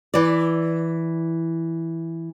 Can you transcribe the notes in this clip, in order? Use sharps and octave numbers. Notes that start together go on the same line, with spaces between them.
E3 D5